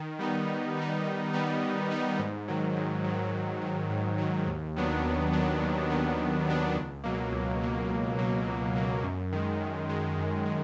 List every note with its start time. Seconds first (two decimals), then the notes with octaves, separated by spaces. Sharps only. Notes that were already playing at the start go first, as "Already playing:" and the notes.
Already playing: D#3
0.19 G3 B3 D#4
0.47 D#3
0.77 G3 B3 D#4
1.05 D#3
1.33 G3 B3 D#4
1.63 D#3
1.90 G3 B3 D#4
2.19 G#2
2.48 D#3 F#3
2.76 G#2
3.04 D#3 F#3
3.33 G#2
3.62 D#3 F#3
3.90 G#2
4.18 D#3 F#3
4.47 D#2
4.76 D#3 F#3 B3 D4
5.04 D#2
5.33 D#3 F#3 B3 D4
5.62 D#2
5.90 D#3 F#3 B3 D4
6.19 D#2
6.47 D#3 F#3 B3 D4
6.76 C#2
7.04 B2 F#3 A#3
7.32 C#2
7.61 B2 F#3 A#3
7.89 C#2
8.18 B2 F#3 A#3
8.47 C#2
8.75 B2 F#3 A#3
9.04 F#2
9.32 D#3 G#3
9.60 F#2
9.89 D#3 G#3
10.18 F#2
10.46 G#3